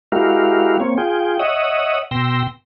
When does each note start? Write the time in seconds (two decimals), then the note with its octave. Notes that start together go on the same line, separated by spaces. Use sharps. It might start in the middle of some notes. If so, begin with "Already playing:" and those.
0.12 G#3 E4 F#4 G4 A#4 F5
0.80 A#3 C4 C#5
0.97 F4 G#4 G5
1.39 C#5 D#5 E5 F#5 D#6
2.11 B2 G5 C6 E6 A#6